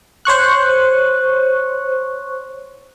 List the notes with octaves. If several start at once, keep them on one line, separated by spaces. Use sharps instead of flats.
C5 C#5 C#6 F#6